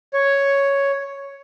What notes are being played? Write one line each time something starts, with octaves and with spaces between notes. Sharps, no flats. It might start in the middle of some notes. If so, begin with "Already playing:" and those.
C#5